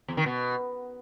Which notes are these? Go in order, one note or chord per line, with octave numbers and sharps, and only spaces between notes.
E2
D#3
B2